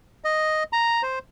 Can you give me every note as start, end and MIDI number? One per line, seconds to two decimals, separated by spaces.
0.24 0.63 75
0.73 1.02 82
1.03 1.19 72